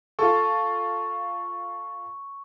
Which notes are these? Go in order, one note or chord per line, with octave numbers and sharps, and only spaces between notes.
F4 A4 C#6